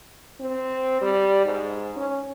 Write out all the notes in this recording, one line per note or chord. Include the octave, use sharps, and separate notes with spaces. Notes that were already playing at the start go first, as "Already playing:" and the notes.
C4
G3
G#2
C#4